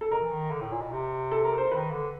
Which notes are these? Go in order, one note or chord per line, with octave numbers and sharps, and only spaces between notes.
A4
B2 A#4
E3
D#3
D3
A2
A#2
B2
C3
A4
A#4
C5
D#3 B4
D3